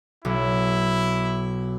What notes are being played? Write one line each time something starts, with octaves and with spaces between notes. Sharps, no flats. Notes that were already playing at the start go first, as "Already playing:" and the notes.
B1 E4